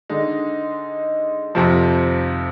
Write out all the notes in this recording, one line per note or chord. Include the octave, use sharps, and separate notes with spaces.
D3 G#3 D#4
F2 C3 F3